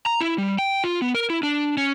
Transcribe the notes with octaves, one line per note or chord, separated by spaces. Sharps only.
A#5
E4
G3
G5
F4
B3
A#4
E4
D4
C#4